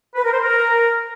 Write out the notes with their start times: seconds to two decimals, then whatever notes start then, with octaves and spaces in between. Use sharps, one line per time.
0.15 B4
0.24 A#4
0.32 C5
0.41 A#4